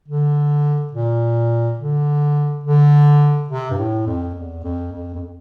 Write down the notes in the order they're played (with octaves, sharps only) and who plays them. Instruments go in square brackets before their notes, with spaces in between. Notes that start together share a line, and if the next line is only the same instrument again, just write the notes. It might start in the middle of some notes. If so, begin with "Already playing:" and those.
[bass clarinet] D3
A#2
D3
D3
C3
G2
A2
F2
E2
F2
F2
F2